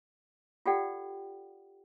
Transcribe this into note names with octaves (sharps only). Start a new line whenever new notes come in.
F4 G4 A4 D5 F#5 G5